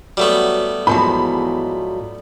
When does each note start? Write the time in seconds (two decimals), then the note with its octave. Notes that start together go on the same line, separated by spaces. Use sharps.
0.17 F#3 G3 A3 B3
0.87 E2 G#2 F3 F#3 B5